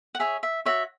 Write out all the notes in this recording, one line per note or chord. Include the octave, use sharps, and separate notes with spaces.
F#5
G#4 C#5 E5
E5
F#4 C#5 E5